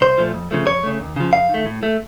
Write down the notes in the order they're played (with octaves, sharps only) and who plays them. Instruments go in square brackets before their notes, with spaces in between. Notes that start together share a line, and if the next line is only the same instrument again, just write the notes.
[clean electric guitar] C2 C5
A#2 F3 A3
F2
C#3 F3 A3
F2 C#5
C#3 A3
D#2
C#3 F3
F2 F5
D#3
A3
A2
A3